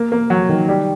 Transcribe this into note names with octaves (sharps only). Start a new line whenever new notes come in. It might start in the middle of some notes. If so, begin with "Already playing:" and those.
Already playing: A#3
A#3
F#3
D#3
G3